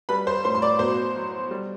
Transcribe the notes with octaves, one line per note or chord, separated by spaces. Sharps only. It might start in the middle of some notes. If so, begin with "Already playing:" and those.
G3 B4 B5
C5 C6
A2 C5 C6
C6
D5 D6
B2 C5 C6
F#3
G3